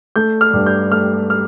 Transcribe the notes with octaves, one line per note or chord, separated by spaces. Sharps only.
A3 G6
F6
G2
G6
A3 F6
F6